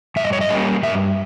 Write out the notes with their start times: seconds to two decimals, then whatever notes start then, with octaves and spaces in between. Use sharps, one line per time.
0.16 G2 E5
0.24 D#5
0.33 C#5
0.41 D#5
0.49 G3 A#3 C#4
0.83 G2 E5